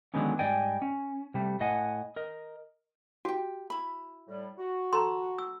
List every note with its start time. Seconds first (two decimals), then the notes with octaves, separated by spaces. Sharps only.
0.14 D3 D#3 F#3 G#3 B3 C#4
0.39 G#2 G3 D5 D#5 G5 G#5
0.82 C#4
1.34 C3 G3 A3
1.60 A2 D#5 F#5 G#5
2.16 A#4 D#5
3.25 F#4 G4 G5
3.70 E4 B5
4.28 A2 G3
4.58 F#4
4.93 A4 A#5 C6
5.38 E6